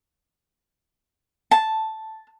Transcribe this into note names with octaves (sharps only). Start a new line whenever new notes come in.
A5